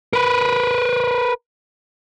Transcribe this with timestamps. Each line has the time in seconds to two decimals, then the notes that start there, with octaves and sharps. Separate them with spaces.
0.13 A#4 B4